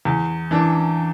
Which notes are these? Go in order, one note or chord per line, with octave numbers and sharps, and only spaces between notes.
E2
E3 D4